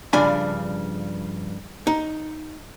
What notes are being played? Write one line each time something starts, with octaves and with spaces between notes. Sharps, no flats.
G2 C#3 F3 D4 G#5 B5
D#4